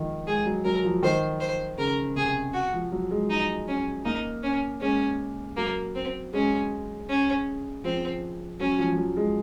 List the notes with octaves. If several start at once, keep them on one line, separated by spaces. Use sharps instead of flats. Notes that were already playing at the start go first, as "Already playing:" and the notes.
Already playing: D#3 F3
G#3 G#4
F#3
F#3 A#4
F3
D#3 C5
C5
C#3 A#4
C3 G#4
F#4
F3
F#3
G#3
D#4
C#4
A#3 D#4
C#4
G#3 C#4
F#3 A#3
C4
G#3 C#4
C#4
F3 C4
F#3 C#4
F3
F3
F#3
G#3